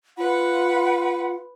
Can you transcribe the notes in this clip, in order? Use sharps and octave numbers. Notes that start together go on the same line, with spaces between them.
F4 B4 F#5